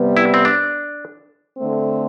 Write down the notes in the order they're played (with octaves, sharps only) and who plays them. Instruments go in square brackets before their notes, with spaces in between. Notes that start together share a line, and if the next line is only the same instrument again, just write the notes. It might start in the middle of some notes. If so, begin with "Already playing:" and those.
Already playing: [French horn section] C3 G3 B3
[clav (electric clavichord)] E4
C4
D4
[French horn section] D3 A3 C4